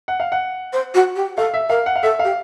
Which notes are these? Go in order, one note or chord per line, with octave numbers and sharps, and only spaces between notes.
F#5
F5
F#5
C5
F#4
G4
A4 F5
E5
A#4 F5
F#5
F5
A4 E5
G4 F5